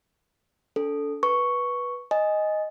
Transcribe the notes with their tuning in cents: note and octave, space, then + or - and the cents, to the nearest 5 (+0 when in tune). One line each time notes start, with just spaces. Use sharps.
D4 -35 A4 +0
B4 -15 C#6 +0
D#5 +0 G#5 +0